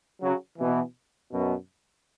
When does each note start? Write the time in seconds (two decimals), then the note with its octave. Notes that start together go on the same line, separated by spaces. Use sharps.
0.22 C#3 F#3
0.59 B2 E3
1.32 F#2 B2